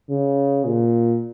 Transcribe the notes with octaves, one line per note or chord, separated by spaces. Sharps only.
C#3
A#2